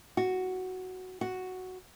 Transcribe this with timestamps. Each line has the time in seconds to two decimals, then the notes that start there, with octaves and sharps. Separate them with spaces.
0.17 F#4
1.21 F#4